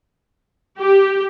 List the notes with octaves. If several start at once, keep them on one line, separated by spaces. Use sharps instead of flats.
G4